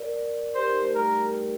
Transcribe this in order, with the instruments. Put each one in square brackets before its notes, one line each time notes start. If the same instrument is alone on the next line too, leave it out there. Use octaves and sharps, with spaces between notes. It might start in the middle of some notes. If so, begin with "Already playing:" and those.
Already playing: [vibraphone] A#4 D5
[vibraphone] G4 A#4 [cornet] C5
[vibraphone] D#4 G4
A3
[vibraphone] G3 [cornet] A#4